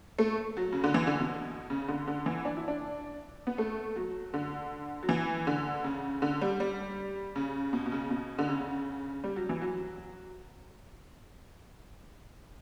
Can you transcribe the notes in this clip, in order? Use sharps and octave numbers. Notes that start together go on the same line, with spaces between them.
A3
F#3
C#3
D3
E3
D3
B2
C#3
D3
D3
E3
D4
E4
D4
B3
A3
F#3
D3
F#3
E3
D3
C#3
D3
G3
G3
C#3
B2
B2
C#3
B2
D3
C#3
G3
F#3
E3
F#3